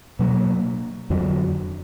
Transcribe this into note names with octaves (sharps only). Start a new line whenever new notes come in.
B2 F#3 A#3
F2 D3 F#3